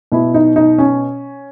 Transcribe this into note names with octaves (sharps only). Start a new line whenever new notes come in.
B2 E4
D#4
D#4
C#4